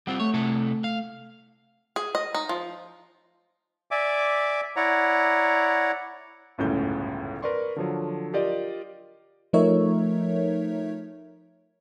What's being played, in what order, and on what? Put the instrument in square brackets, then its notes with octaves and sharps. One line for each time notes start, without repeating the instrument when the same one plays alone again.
[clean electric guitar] G3 C4 F4 [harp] F#5
[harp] A3 [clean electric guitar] C#5
[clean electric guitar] C3 E4 A4
F5
[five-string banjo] G#4
D#5
D#4
F3
[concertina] D5 E5 G#5 D6
E4 C#5 D5 F#5 A#5
[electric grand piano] G1 C#2 F#2 A2 C#4 G6
A#4 B4 D5 C6 C#6
D3 F3 F#3
F4 G4 A#4 D5 D#5
[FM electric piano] F3 A3 D#4 A#4 C#5 E5